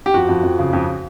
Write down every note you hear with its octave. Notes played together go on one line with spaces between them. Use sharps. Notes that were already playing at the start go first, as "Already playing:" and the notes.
G4
F2 F#4
F2
F2
C#3
F2